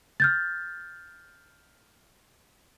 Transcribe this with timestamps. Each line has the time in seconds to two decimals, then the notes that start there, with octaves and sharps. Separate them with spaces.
0.20 F6 G6 A6